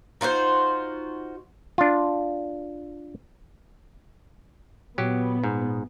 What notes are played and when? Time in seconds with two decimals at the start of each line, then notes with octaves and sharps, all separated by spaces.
0.21 D#4 F4 F#4 C5
1.78 D4 F4
4.98 A#2 F#3 B3 G4
5.44 G#2